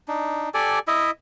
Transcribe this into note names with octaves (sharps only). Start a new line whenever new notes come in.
D4 D#4
G4 A4 D5 G#5
E4 D#5 E5